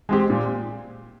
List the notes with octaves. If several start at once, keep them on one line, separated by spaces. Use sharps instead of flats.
G#3 C4 G4
A#2